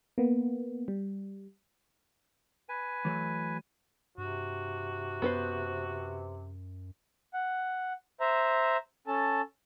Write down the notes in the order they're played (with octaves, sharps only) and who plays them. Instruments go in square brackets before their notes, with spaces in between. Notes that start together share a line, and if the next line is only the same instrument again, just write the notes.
[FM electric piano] A#3 B3
G3
[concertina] B4 G#5
[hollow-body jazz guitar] E3 F#3 A3
[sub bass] G2 [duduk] C3 [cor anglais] F#4
[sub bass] F#2 [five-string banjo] B3 B4 C5
[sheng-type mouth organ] F#5
C5 E5 A#5
C#4 A4 A5